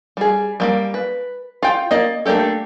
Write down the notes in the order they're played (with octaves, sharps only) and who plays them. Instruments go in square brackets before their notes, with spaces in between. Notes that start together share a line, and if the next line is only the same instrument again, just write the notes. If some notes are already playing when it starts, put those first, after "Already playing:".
[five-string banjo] G3 G#4
G3 A3 A#3
B4
F4 G5
A#3 D5 D#5
A3 A#3 D4 G4 A4